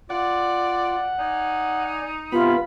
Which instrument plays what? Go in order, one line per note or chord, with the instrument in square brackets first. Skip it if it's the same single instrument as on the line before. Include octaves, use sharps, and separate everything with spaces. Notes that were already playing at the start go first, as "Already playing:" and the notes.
[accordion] F4 [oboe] D5 [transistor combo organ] F#5
[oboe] D#4 [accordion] D5 G#5
[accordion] C3 [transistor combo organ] B3 B5 [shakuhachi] F4